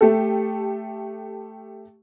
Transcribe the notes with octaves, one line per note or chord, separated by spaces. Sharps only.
A3 G4 A4